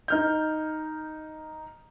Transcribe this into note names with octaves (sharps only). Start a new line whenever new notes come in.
D#4 F6 G6